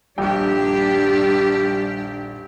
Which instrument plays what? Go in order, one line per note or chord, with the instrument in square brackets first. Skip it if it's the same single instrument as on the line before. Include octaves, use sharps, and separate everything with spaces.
[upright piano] D#1 A#1 G5 [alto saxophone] G3 [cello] D4 G4